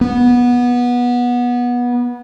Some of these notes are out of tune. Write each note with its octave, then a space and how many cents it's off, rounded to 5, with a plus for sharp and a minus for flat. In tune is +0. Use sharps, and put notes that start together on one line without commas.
B3 -20